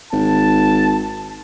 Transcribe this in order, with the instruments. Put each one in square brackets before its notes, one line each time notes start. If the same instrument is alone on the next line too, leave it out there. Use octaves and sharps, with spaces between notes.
[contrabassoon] G#1 [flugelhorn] A5